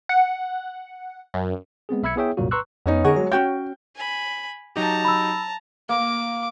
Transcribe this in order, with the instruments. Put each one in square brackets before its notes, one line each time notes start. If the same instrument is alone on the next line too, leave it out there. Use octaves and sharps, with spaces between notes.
[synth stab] F#5
F#2
[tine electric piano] G#3 B3 C4 G#4
B1 E5 B5 E6 G#6 C#7
B3 E4 G#4 C#5 E5 G5
C2 F#2 A#2 F#3 A#3 F#4
B4 A#5 C6 C#6 E6 F#6
[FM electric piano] F2 [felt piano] B3 C#4 D#4
[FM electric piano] D3 F#5 C#6 [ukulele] G#4 A#4
[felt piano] F#3 G#3 [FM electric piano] C#5
[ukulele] C#4 F#4 G5 [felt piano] G6
[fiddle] G#5 B5
[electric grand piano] F#3 D#4 G4 [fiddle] A5 A#5
[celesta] B5 E6
[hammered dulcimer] A#3 [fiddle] D6